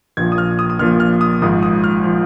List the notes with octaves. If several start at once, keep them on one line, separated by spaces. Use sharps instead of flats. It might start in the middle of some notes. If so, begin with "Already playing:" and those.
A#1 A#2 F3 G#6
D#6
F6
D#6
D#6
A#1 A#2 F3 F6
F6
D#6
G#1 G#2 F3 D#6
D#6
F6
F3